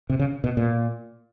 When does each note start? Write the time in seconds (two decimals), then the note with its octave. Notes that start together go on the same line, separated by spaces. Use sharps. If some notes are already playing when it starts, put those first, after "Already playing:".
0.10 C3
0.19 C#3
0.44 B2
0.57 A#2